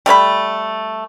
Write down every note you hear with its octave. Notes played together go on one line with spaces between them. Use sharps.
G3 A3 C#5 B5